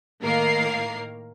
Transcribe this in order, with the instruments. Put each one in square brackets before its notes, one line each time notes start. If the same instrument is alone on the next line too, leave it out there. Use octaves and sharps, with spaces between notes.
[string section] A2 D#3 A#3 A#4 F5 C7